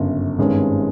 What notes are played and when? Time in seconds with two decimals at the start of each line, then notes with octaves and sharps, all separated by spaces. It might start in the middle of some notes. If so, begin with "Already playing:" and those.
Already playing: G1 F#2 C#3
0.38 G#1 G2 D#3 G#3 C#4